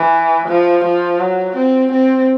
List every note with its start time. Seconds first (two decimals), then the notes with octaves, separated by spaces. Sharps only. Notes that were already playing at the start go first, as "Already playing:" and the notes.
Already playing: E3
0.48 F3
0.84 F3
1.20 F#3
1.56 C4
1.91 C4